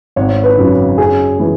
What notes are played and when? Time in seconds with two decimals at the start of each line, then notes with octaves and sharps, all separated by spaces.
0.16 G#1 C#5
0.44 B4
0.58 F#2 C#3 F#3
0.98 F#2 G#4
1.39 E3 G#3